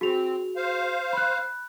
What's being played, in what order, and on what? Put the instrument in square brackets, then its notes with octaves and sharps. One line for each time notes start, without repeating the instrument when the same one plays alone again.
[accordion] C4 [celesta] F#4 G#4 F7
[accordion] C5 F5
[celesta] B5 F#6